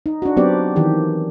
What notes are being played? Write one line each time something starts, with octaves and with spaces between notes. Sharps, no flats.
D#4
D4 F#4
F#3 B3 C4 D4 G4 D5
D#3 E3 G4